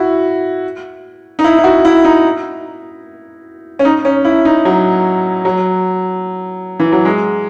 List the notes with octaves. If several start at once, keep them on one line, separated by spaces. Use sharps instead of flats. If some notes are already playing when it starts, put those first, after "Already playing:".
Already playing: E4 F#4
D#4
E4
E4
F#4
E4
D#4
C#4
D#4
C#4
E4
D#4
F#3
F#3
E3
F#3
G#3